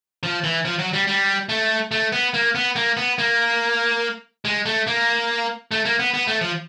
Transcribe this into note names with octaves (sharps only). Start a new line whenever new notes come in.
F3
E3
F3
F#3
G3
G3
A3
A3
B3
A#3
B3
A#3
B3
A#3
G#3
A3
A#3
A3
A#3
B3
B3
A3
F3